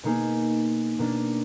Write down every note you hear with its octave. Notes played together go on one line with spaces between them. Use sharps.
B2 A#3 D#4 G#4
B2 A#3 D4